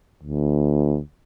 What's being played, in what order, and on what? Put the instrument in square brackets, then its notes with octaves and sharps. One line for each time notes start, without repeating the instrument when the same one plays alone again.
[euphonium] D2